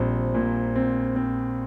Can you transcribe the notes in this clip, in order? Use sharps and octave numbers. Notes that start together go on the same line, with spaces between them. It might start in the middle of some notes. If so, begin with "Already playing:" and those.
Already playing: A#1 G3 C4
A#2
C4
C4